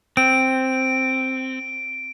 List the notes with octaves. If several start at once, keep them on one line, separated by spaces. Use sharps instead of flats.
C4 D7